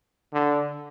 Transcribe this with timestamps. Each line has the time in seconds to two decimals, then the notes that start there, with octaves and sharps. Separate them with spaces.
0.33 D3